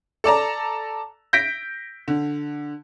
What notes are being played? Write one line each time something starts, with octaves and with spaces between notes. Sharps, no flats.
A4 D5 A5 A#5
G6 A#6 B6 D7
D3